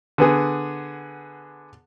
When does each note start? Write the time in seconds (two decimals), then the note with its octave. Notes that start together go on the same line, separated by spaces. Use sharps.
0.18 D3 B3 G#4